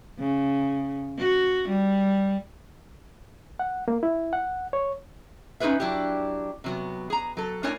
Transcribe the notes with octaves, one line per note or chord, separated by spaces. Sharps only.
C#3
F#4
G3
F#5
A#3
E4
F#5
C#5
C#4 D#4 F#4 G#4 B4 E5
F#3 D4 E4 G4
C3 F#3 B3
G#4 A#5
F#3 A4
A3 D4 E4 A#4 C#5 G#5